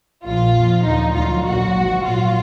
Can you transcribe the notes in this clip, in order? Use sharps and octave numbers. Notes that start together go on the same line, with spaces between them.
A#1 A#2 F3 F4
F2 F3
D#2 D3 F3 D#4
D2 D3 F#3 F4
B1 A#2 F#3 F#4
G#1 G#2 F3
A#1 A#2 F#3 F4